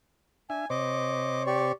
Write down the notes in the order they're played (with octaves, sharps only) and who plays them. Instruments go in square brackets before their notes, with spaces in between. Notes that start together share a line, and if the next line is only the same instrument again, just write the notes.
[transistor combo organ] D4 E5 [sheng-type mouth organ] G#5
[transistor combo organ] C3 C5 C#5 [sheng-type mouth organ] D#5 D6
[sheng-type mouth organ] G4 D5 C#6